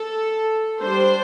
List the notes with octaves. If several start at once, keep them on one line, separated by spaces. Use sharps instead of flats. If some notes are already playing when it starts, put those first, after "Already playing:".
Already playing: A4
G3 D4 C5